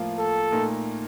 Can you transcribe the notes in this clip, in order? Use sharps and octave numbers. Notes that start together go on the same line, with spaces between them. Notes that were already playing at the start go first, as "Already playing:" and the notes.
Already playing: A2 F3 A#3 F4
A4
A#2 A3 D#4 A#4